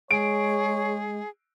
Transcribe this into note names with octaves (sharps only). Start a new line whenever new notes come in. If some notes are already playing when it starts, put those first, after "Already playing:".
G#3 G#4 C#5 D7